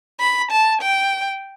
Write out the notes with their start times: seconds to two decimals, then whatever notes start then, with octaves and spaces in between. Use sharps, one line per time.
0.20 B5
0.51 A5
0.82 G5